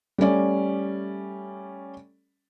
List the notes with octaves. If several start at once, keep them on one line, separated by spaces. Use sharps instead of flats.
G3 A3 C#4 D5